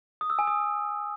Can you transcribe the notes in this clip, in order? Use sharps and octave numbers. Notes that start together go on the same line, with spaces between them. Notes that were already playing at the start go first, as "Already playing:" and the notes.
D#6
E6
G#5
D#6